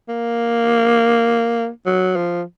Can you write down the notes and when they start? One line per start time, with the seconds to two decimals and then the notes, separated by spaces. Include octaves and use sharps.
0.09 A#3
1.86 F#3
2.16 F3